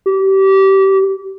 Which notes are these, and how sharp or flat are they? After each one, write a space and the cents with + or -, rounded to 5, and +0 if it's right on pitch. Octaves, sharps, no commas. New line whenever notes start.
G4 -25